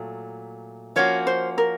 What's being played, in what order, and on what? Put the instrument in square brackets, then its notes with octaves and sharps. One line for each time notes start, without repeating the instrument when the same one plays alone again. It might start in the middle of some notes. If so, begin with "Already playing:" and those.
Already playing: [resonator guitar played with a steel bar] A#2 F#3 A3
[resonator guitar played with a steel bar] F3 A#3 C#4 F#4 [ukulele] C#5
[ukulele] C5
A#4